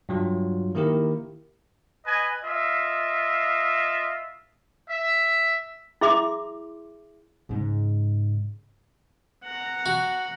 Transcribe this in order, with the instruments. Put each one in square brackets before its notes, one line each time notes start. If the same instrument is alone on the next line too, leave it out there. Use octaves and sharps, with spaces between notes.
[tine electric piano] G2 F#3 F4
D#3 A#3 E4 G4 A#4
[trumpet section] B4 D#5 G#5
F4 D#5 E5
E5
[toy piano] E4 G#4 E5 C6 D6
[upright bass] G#2 C#3
[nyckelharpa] F#5 A#5
[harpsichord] F#4